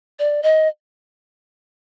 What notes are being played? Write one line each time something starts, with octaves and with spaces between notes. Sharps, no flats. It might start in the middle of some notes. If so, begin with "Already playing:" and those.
D5
D#5